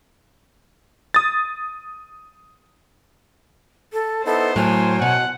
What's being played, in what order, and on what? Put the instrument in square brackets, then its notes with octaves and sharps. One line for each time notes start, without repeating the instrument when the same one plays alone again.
[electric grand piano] D#6 A6
[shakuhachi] A4
[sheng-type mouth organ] B3 D#4 E4 [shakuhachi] A4 [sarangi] C5
[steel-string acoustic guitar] A2 F#3 [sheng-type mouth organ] A#4 C#5 G5 [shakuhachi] G#5
[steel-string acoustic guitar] B2 [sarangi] F#5